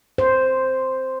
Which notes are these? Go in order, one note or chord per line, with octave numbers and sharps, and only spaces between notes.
C5